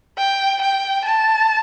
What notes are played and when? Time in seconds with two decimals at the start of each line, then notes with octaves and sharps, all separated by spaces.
0.18 G5
0.61 G5
1.04 A5